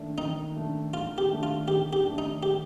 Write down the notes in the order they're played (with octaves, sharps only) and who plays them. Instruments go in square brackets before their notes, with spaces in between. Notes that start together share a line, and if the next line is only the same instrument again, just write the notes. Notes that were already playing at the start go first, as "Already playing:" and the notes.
Already playing: [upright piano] D#3 A3 D4
[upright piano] D#3 [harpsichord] D#4
[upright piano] A3 D4
[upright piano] D#3 [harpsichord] F4
[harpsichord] G4
[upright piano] A3 D4
[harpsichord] F4
[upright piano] D#3 [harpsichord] G4
[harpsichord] G4
[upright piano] A3 D4
[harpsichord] D#4
G4